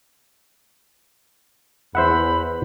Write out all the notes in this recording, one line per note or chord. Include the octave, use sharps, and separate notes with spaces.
E2 C5 E5 F#5 B5